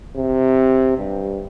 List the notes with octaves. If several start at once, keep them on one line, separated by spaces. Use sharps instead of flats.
C3
G2